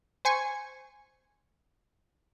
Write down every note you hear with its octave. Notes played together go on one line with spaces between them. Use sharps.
C5 G#5 C#6